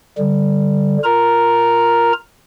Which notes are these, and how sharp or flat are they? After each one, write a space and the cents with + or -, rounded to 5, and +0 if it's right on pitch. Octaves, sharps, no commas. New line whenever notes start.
D3 +0 G3 +0
F4 +0 A#4 +0 A#5 +0